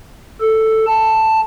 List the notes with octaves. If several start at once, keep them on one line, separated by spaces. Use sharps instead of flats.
A4
A5